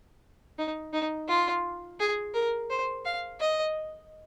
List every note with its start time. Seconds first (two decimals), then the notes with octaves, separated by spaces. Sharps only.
0.59 D#4
0.93 D#4
1.28 F4
2.00 G#4
2.34 A#4
2.70 C5
3.05 F5
3.40 D#5